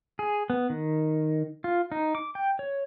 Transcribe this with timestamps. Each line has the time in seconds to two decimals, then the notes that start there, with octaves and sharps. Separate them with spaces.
0.19 G#4
0.50 B3
0.70 D#3
1.64 F4
1.92 D#4
2.15 D6
2.35 G5
2.59 C#5